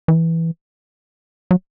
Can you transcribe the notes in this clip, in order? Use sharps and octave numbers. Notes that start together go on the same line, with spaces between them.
E3
F#3